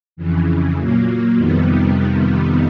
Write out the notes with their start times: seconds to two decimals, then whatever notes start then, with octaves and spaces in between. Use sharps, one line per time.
0.16 F2 C#3 E3
0.77 A#2 F#3 A#3
1.36 F2 C3 D#3 G3 B3